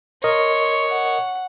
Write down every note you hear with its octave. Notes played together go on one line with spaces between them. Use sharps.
A#4 C#5 D#5 C6
F#5